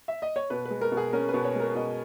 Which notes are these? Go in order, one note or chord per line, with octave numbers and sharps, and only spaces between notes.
E5
D#5
C#5
B2 B4
G#3 B4
A#4
B2
G#4
C#4 A#4
B4
B2
C#5
G#3 A#4
B2 D#5